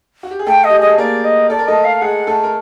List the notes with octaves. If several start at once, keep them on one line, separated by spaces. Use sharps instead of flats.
F#4
G4
G#4
A3 A4 G5
D#5
G4
G#4 D#5
A4
A#3 A#4 D5
D#5
A4 D5
A#4
A3 A4 D#5
F5
G#3 G#4 F#5
A3 A4
A#4